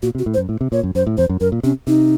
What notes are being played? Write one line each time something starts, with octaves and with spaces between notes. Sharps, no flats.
A#2 F#4
C3
F#4
A2
C5
F#2
A2
C3
A#2 C#5
F#2
F#2 C5
A2
F2 C5
F#2
F#2 A#4
A#2
C3 C#4
C3 D#4